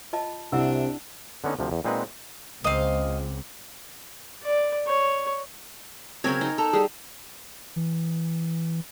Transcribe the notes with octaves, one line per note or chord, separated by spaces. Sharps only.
F4 D#5 A5
C2 C3 D4 E4 F#5 E6
D3 B3 C#4 D#4
D2 C3 F3
E2
A#2 G#3 C4 D#4 B4 F#5
C#2 A#3 C4 D#5 F5
D5
C#5
C#3 F#3 C4 A#4 C#5 G#6
D#4
A4 A#5
G3 G4 G#4
E3